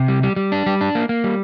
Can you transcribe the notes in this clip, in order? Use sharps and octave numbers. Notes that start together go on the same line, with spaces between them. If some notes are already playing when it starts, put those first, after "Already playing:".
Already playing: C3
G3
G3
G3
D4
G3
D4
A#3
A#3
G3